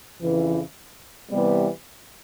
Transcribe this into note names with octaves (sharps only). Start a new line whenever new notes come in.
F2 C#3 E3
C3 E3 G3 B3